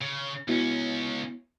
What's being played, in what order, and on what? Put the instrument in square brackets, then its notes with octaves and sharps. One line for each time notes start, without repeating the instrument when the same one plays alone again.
[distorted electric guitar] C#3
[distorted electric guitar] C#2 C#4 [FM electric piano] B3 E4 F#4